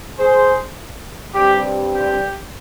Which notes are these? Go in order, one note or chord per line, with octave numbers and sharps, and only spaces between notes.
G#4 C5
G2 G3 C4 G4
G4